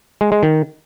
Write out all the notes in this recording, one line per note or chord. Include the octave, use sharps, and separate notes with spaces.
G#3
G#3
D#3